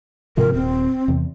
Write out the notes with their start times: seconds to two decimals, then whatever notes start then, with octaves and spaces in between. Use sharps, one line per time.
0.37 G#2 C3 F3 A#4
0.54 D#1 C4
1.08 E2 C3